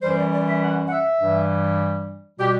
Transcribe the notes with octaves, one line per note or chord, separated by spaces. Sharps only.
F#2 E3 G3 C5
D5
D5
E5
F#5
F#5
E5
G2 E3 G3
B2 G3 G4